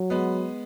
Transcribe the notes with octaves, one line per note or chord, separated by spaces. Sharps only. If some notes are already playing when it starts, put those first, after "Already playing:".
Already playing: F#3
G#3 B3